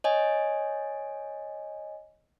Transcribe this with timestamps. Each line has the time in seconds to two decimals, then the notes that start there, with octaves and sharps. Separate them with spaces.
0.04 C#5 D#5 G#5